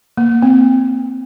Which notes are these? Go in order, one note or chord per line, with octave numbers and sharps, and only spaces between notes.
A#3
C4